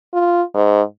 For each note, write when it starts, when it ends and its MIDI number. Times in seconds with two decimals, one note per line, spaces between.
0.13 0.42 65
0.54 0.81 44